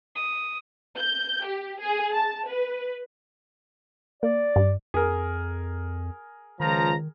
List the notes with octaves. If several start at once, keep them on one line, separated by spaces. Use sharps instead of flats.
D#6
G6
G4
G#4
A5
B4
A#3 D5
G2
F2 G#4 A#4
C#2 D#3 F3 A#5